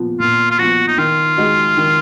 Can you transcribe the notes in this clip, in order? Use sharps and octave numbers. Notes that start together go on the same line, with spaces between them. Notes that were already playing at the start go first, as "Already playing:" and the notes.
Already playing: A#2 F3 B3
A#2 F4
F4
F3 B3 F#4
D#4
D#3 F4
G#3 D#4 F#4
D#3